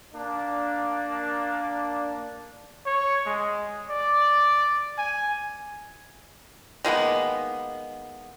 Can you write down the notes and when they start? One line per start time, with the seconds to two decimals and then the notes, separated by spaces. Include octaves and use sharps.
0.14 A#3 D4
2.86 C#5
3.26 G#3
3.90 D5
4.99 G#5
6.85 D#3 G#3 A#3 B3